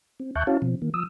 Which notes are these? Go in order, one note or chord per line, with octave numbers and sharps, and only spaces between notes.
C4
D#2 E5 A5 C#6 F#6 G6
C#4 E4 F#4 C#5 F5 A5
B2 F3 C4
D#3 A#3
F3 D#6 E6